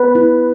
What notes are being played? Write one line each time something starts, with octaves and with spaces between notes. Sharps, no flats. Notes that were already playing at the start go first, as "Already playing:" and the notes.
Already playing: B3 B4
E4